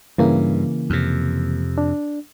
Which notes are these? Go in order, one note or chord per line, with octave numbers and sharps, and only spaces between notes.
G2 C#3 E3 A#3
F2 C3
D4